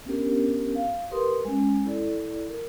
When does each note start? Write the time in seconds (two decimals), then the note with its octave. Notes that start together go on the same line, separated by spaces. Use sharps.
0.06 B3 C#4 D4 G4 A#4
0.75 F5
1.11 G4 A#4 B4 C6 D#6
1.45 G#3 C#4
1.85 E4 A4 D5
2.49 A#4